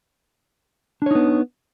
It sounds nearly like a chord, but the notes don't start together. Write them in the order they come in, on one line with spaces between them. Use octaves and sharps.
D4 C#5 D#4 B3